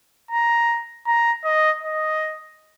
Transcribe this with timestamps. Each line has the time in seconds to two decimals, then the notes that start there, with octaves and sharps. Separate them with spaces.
0.31 A#5
1.07 A#5
1.45 D#5
1.83 D#5